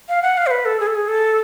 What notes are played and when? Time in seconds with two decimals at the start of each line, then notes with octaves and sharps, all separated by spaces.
0.09 F5
0.22 F#5
0.37 F5
0.47 C5
0.51 B4
0.65 A4
0.80 G#4
0.87 A4
0.95 G#4
1.08 A4